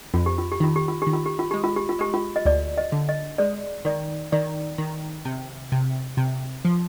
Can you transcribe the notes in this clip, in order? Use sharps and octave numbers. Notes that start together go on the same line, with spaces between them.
F2 F4
G4
F4
G4
D#3 F4
G4
F4
G4
D#3
F4
G4
F4
G#3 G4
F4
G4
F4
G#3 G4
F4
D#5
D2 D5
D#5
D3
D#5
G#3 D5
D#3 D5
D#3 D5
D#3
C3
C3
C3
F3